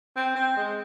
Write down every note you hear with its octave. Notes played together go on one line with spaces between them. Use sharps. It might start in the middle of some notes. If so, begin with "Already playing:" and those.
C4
C4
G#3